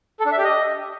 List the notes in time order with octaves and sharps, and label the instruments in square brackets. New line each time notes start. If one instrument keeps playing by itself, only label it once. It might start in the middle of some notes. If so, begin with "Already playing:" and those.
[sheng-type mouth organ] A4
D4
E5
G4
D#5